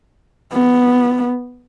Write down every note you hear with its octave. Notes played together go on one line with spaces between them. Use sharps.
B3